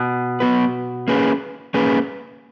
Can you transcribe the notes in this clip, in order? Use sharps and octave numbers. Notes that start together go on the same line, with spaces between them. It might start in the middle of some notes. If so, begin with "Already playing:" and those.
Already playing: B2
F#3 B3 F#4 B4
A#3 C#4 G#4 B4
A#3 C#4 G#4 B4